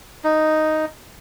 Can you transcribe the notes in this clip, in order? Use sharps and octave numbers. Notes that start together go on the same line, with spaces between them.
D#4